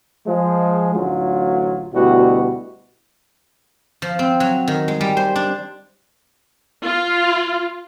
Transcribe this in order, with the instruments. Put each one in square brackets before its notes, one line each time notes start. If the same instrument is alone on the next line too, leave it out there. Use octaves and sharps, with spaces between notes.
[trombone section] F3 G#3
A1 D2 F#3 F4
D2 B2 G3 E4 F#4
[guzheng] F3
C4
F#3
D#3
G#3
G3
C5
D4
[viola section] F4